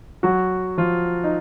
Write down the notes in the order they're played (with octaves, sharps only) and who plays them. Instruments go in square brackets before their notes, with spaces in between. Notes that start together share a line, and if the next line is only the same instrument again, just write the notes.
[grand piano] F#3 F#4
F3 F4
D#4